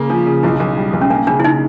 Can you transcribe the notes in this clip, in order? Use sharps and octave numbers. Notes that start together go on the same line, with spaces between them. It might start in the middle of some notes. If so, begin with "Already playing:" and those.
Already playing: C#3 A#3
F3 D4
C#3
B1 E4
B1
G3
B1
C#4
A#3 D4
C#3 D4
E4
C#3 D#4